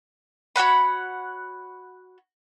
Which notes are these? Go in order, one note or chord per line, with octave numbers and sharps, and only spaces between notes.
F#4 C#5 F#5 B5